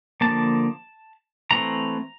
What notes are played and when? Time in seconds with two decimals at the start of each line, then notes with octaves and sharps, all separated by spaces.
0.21 D3 F3 A#3 A5
1.51 E3 A3 C4 A#5